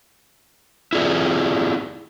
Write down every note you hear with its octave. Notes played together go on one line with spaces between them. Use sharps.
E4 F4 G#4 D5